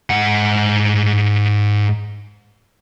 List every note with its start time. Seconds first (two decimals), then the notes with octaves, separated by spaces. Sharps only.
0.10 G#2 F#5